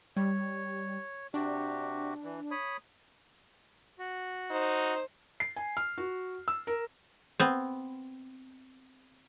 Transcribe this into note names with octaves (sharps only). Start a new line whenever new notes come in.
G3 C#5
C3 D4 F#4 G4
E3
C#5 B5 D#6
F#4
D#4 C5
C7
G#5
F6
F#4
E6
A#4
B3 C4